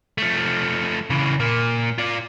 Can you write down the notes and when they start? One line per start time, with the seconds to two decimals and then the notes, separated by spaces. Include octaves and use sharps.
0.18 F3 A3
1.10 C#3 E3
1.40 A#2 A#3
1.98 F4 D5